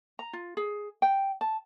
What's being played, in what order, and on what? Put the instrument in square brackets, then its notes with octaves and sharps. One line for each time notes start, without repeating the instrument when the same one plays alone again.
[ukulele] A#5
F4
G#4
G5
A5